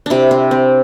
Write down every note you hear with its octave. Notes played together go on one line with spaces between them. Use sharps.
C3 D4 E4
C4
C4